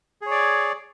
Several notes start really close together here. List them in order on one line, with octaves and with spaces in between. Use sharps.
G#4 C#5 D5